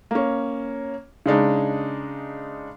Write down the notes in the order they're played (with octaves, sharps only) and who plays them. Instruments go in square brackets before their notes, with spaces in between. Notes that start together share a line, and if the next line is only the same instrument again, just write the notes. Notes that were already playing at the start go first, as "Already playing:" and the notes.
[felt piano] A#3 C#4
C#3 G#3 D4 D#4